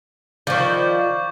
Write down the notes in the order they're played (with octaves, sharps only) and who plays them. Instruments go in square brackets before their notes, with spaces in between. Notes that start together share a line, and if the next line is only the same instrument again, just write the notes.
[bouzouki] D#3 F3 [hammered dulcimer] D5 B5 [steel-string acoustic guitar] F5 [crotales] C#6 G6